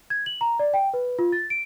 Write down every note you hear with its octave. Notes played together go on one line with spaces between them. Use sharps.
G#6
F#7
A#5
D5
G5
B4
F4
A6
D7